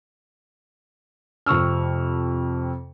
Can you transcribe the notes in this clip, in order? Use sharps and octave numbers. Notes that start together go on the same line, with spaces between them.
F2 C3 C#6 E6 F6